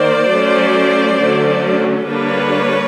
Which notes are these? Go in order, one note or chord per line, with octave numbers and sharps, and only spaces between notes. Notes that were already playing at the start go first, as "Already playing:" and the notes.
Already playing: D#3 A#3 C5 D5
F#3 A3 C#4
D3 F#3 A3 C#4
D3 G3 A#3 D4 B4 C#5